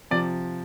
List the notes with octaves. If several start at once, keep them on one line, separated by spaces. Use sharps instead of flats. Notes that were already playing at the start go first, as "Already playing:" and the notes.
C3 F3 D5